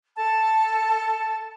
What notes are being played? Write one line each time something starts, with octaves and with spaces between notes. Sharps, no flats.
A4 A5